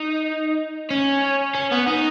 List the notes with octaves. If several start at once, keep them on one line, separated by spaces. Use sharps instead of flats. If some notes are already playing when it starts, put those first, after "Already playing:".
Already playing: D#4
C#4
C#4
B3
D#4